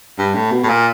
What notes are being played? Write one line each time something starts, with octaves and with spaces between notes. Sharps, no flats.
G2
A2
B2
A2
A#2